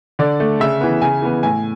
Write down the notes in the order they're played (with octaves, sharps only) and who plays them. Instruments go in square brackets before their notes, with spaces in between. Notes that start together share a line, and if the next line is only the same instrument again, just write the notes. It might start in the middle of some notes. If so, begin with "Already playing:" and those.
[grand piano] D3 D5
A3
C#3 E5
E3 B3
C#3 G#5
E3 B3
A2 G#5